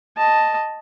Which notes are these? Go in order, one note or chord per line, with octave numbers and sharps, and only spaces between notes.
D#5 A5